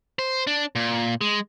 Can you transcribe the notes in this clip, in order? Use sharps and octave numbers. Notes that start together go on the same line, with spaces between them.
C5
D4
A#2
G#3